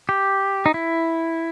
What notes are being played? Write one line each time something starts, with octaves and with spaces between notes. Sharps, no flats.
G4
D#4
E4